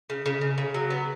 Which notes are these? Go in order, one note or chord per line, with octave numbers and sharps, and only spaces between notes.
C#3
C#3
C#3
C#3
F#3
B3